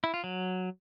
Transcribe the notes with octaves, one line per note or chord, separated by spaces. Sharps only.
E4
F4
F#3